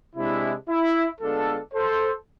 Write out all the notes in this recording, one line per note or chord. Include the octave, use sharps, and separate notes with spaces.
C3 G#3 D4 E4
E4
D3 G#3 B3 D4 F4 A4
A4 C5